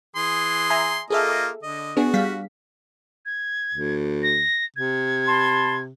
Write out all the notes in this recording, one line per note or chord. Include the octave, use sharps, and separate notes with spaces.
E3 G#4 C6
E5 G#5 A#5
A#3 F4 G#4 A4 D#5 E5
D3 D#5
B3 D4 F#4 G#4
G3 F5 B6
G#6
D2
A#6
C3 G#6
A5 B5 C6